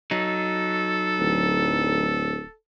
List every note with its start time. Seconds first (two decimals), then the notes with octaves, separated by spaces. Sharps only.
0.11 F#3 D#4 A4
1.19 D1